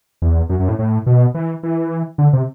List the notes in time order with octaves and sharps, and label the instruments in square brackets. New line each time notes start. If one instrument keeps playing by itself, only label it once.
[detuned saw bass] E2
F#2
F#2
A2
A2
B2
E3
E3
D3
C3